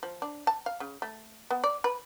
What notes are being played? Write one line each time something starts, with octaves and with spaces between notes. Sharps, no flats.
F3
D4
A5
F5
C#3
A3
B3
D5
B4